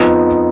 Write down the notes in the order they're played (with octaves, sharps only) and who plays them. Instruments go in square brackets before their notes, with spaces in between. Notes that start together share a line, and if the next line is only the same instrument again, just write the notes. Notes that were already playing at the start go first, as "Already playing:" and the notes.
Already playing: [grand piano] F2 F3 B3 D#4